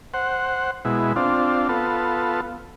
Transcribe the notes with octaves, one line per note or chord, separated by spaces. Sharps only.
C5 F#5
B2 G#3 E4
C4 D4 F4
B3 F4 A4